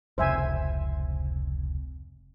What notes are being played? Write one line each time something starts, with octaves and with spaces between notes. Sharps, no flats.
F1 C#2 C3 C5 E5 G#5